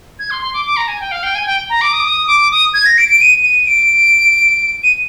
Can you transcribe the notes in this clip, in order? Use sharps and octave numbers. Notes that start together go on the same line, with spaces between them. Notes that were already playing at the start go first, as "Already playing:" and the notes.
G#6
C6
C6
D6
D6
A#5
G#5
G5
F5
G5
G#5
G5
A#5
D6
D#6
D6
D#6
D6
D#6
G#6
A#6
D7
D7
D#7
D#7
D7
D#7